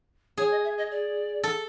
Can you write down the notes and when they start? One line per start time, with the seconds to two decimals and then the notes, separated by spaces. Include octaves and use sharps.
0.37 G#4 C#5
0.51 D#5
0.64 E5
0.78 D#5
0.91 D5
1.43 A4